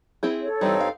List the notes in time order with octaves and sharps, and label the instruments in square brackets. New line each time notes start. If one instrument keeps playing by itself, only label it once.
[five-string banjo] C4 E4 G#4
[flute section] A4 C#5
[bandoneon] G2 C4 D#4 [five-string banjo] E3 G3
[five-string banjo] F5